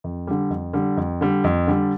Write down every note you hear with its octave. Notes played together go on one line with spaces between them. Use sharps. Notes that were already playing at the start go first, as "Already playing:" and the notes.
F2
D3 G3
F2
D3 G3
F2
D3 G3
F2
D3 G3